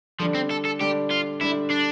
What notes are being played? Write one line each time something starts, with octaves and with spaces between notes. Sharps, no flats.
D3 F3 G3 D4
C4
A4
A4
D3 G3 D4 G4
F4
D3 G3 D4 E4
D4